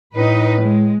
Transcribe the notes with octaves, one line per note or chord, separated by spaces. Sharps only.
A2 D#4 B4
G#3